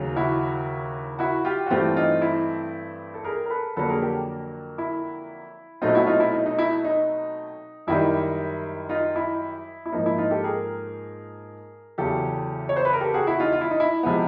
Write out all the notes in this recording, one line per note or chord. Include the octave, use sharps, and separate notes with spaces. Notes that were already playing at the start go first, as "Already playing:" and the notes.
Already playing: D#2 C#3 F#3
E4 F#4
E4 F#4
F4 G4
F#4
G2 E3 A3 C4 F4 G4
D#4 F4
E4
A4
G#4 A#4
A#4
A4 B4
F2 D3 F#3 A#3 A4 B4
G#4 A#4
G4 A4
E4
B2 F#3 A3 C4 D#4 F4
E4 F#4
D#4 F4
E4
D#4
D#4
E4
D#4
F#2 D#3 G3 E4
D#4 F4
E4
E4
G#2 F3 A#3 D#4
E4
D#4 F4
G4 A4
G#4 A#4
E2 C#3 F#3 G4 A4
C#5
C5
B4
A#4
G4 A4
F#4 G#4
E4 F#4
D#4 F4
F4
E4
D#4
E4
C3 F3 G#3 B3